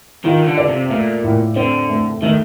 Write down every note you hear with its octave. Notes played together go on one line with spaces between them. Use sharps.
D#3 F4
D3
D5
C3
A#2 A3
A2
D3 C4
A3
D#3 A3